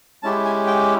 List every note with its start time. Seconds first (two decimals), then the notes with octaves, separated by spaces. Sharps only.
0.23 G#3 C#4 E4 G4 A5
0.45 G#5
0.67 G5